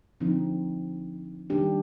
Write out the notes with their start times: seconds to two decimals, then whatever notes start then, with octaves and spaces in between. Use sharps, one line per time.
0.20 D3 F3 C4 D#4
1.50 D#3 G3 D4 G4